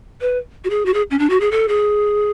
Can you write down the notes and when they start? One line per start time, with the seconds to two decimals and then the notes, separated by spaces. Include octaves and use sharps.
0.21 B4
0.64 F#4
0.70 G#4
0.86 F#4
0.94 G#4
1.11 C#4
1.19 D4
1.30 F#4
1.40 G#4
1.51 A4
1.68 G#4